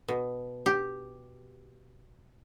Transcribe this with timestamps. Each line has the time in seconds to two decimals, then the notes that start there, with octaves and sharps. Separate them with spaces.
0.08 B2
0.66 G4